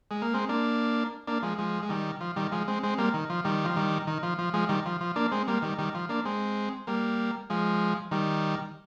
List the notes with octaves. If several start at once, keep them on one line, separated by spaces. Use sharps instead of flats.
G#3
A#3
G#3 C4
A#3 D4
A#3 D4
F3 G#3
F3 G#3
G#3
D#3 G3
F3
D#3 G3
F3 G#3
G#3 C4
G#3 C4
G3 A#3
D#3
F3
D#3 G3
F3
D#3 G3
D#3
F3
F3
F3 G#3
D#3 G3
F3
F3
A#3 D4
G#3 C4
G3 A#3
D#3 G3
D#3 G3
F3
A#3 D4
G#3 C4
G3 A#3
F3 G#3
D#3 G3